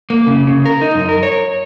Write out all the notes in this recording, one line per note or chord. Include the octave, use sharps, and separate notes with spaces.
A#3
C#3
C#3
A#4
D#4
F#2
A#4
C#5